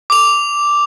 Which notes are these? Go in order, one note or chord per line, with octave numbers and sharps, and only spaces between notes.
D6 F7